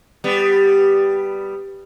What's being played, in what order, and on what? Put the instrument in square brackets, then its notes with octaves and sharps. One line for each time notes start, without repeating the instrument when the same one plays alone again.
[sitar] G3 B3